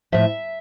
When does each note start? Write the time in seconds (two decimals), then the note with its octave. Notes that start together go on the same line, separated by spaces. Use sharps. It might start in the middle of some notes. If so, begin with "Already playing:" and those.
0.12 A2 F3 E5